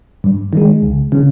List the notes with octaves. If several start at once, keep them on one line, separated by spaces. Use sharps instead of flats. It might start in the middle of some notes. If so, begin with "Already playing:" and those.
G2
D#3 G#3
C#2
C#3